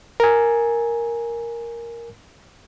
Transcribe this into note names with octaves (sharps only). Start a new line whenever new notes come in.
A#4 G#5